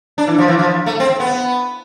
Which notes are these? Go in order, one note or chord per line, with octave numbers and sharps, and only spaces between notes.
D4
E3
F3
E3
F3
A3
C4
B3